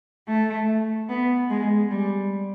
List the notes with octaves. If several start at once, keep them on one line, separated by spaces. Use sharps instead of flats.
A3
B3
G#3
G3